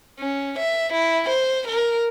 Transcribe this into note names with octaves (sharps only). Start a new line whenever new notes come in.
C#4
E5
E4
C5
A#4